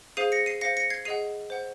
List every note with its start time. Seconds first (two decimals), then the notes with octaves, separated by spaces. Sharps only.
0.17 G#4 C5 F5 C7 D#7
0.32 A#6 C#7
0.46 C7 D#7
0.61 C5 F5 A#6 C#7
0.77 A#6 C#7
0.90 G#6 C7
1.05 G#4 D#5 F#5 C7 D#7
1.50 C5 F#5